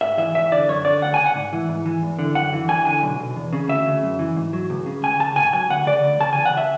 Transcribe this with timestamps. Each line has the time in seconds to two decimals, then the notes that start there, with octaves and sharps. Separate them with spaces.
0.01 G#2 E5
0.18 E3 E5
0.35 E2 E5
0.52 D3 D5
0.68 F#2 C#5
0.85 D3 D5
1.02 D2 F#5
1.14 C#3 G#5
1.26 F#5
1.35 G#2
1.53 E3
1.69 G#2
1.86 E3
2.02 E2
2.19 D3
2.35 F#2 F#5
2.53 E3
2.69 E2 G#5
2.85 D3 G#5
3.03 B1
3.20 B2
3.36 E2
3.53 C#3
3.68 D2 E5
3.87 C#3
4.03 F#2
4.19 E3
4.37 G#2
4.53 F#3
4.70 C#2
4.86 C#3
5.03 C#2 G#5
5.20 C#3 A5
5.36 G#2 G#5
5.53 F#3 G#5
5.70 D2 F#5
5.87 C#3 D5
6.03 D2
6.20 C#3 A5
6.33 E2 G#5
6.45 F#5
6.53 C#3 E5